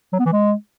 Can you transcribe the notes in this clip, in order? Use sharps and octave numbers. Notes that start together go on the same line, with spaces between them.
F#3
B3
E3
G#3